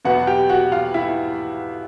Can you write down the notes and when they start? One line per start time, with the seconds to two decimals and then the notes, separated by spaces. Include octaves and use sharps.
0.05 E2 B2 F#3 B3 F#4 F#5
0.27 G4 G5
0.49 F#4 F#5
0.72 F4 F5
0.94 E4 E5